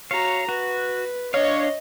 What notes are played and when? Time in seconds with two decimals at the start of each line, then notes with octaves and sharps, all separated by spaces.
0.11 F#4 C#5 F5 A#5
0.49 F#4 B4
1.34 D4 C#5 D#5 F5